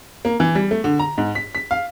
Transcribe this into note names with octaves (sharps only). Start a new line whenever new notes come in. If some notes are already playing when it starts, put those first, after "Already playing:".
A#3
E3
G3
A3
D3
A#5
G#2
B6
B6
F5